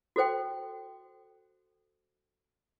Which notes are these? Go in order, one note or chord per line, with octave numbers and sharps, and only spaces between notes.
F#4 A4 C5 G5